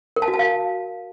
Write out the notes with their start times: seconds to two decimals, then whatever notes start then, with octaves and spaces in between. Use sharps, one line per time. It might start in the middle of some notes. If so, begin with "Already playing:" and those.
0.16 A#4
0.22 A5
0.28 F#4
0.34 A5
0.39 F5